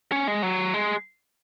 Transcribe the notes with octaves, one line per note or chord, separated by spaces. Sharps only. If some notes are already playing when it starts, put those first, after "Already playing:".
C#4
G#3
F#3
G#3